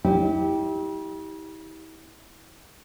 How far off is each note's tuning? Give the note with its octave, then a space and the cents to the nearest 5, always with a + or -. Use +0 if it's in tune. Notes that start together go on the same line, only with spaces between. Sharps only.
E4 -40 G4 +0